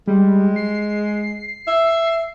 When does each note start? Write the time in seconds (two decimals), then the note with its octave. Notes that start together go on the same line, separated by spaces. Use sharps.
0.07 G3 G#3
0.56 C7
1.67 E5